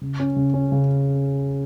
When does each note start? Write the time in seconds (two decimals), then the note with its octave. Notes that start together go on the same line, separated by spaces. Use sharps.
0.01 C#3
0.20 C#4
0.36 C#3
0.54 C#4
0.72 C#3